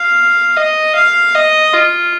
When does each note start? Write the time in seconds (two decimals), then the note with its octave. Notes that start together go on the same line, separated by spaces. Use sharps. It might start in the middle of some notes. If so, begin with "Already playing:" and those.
Already playing: F5
0.57 D#5
0.95 F5
1.35 D#5
1.74 F4